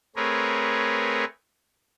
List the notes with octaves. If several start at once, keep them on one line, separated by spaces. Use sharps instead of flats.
A3 C4 G#4 A#4 B4 C#5